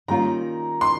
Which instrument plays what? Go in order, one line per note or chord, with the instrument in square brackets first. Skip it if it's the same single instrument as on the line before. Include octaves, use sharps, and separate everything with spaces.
[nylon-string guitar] D#3 G3 A#3 C#4 F4 [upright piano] A#5
[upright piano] C6